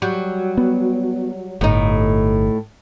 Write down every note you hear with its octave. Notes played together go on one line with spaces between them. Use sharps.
F#3 G3
B3
G1 A2 D#4